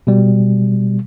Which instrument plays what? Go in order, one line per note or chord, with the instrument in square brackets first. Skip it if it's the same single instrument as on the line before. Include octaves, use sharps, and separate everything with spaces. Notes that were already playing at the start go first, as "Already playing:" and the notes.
[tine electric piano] B2 G3